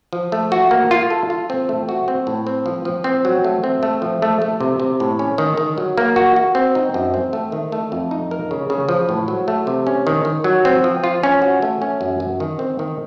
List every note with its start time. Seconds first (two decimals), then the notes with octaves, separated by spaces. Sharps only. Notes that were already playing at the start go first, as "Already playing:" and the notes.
0.13 F3
0.32 A3
0.52 F#4
0.71 A#3
0.91 F4
1.11 A4
1.30 F4
1.50 C4
1.69 A3
1.89 F#4
2.08 C4
2.27 A2
2.47 C4
2.66 F3
2.85 F3
3.04 C4
3.25 F#3
3.44 A3
3.64 C4
3.83 A3
4.02 F3
4.22 A3
4.42 A3
4.60 C3
4.80 C3
5.00 A2
5.19 C#4
5.38 D#3
5.57 D#3
5.78 F#3
5.98 A#3
6.16 F#4
6.36 F#4
6.55 C4
6.75 D#4
6.94 F#2
7.14 C4
7.33 A3
7.52 D#3
7.72 A3
7.92 F2
8.11 D#4
8.31 A#4
8.51 C#3
8.70 C#3
8.89 F3
9.09 A2
9.28 F#3
9.48 A3
9.67 C3
9.87 C#4
10.07 D#3
10.25 D#3
10.44 F#3
10.65 C4
10.84 F3
11.04 F4
11.23 C#4
11.42 F#4
11.62 A3
11.82 C#4
12.01 F#2
12.20 F#2
12.40 D#3
12.59 C4
12.79 D#3